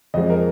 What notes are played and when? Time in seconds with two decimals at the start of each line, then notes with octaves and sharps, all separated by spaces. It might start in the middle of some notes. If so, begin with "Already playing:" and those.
0.14 F2 F3 G#3 D#5
0.30 A#4